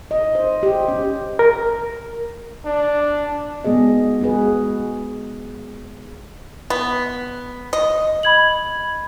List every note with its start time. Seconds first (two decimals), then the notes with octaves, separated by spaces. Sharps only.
0.11 D#5
0.35 C5
0.63 G4
0.88 C#4
1.39 A#4
2.65 D4
3.65 G#3 B3 F#4 G#4 D#5
4.21 G#3 F#4 G#4 B4
6.70 B3
7.73 D#5
8.23 B5 G#6 F#7